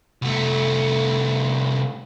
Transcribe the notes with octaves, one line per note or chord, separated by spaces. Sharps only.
C2 A3